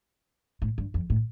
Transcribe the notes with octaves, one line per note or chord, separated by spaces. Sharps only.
A2
G2
F2
A2